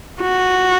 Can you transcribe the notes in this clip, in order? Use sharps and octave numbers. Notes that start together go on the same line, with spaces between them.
F#4